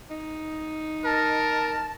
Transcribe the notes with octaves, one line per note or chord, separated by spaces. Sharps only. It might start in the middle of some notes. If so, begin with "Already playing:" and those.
D#4
A#4 A5